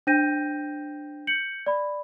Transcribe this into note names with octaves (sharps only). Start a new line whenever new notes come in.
D4 C5 G5 G6 A#6 D#7
G6 C#7 F#7
D5 B5